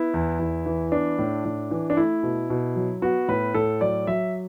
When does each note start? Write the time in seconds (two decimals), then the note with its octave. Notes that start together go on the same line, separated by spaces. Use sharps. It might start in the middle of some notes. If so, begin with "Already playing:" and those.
Already playing: B3 E4
0.14 E2
0.39 E2
0.66 E3
0.92 B3 D4
1.19 A2
1.45 A2
1.71 E3
1.90 D4
1.97 A3 E4
2.23 B2
2.50 B2
2.76 F#3
3.02 B3 F#4
3.28 A2 B4
3.54 A2 A4
3.81 F#3 D5
4.07 F#3 E5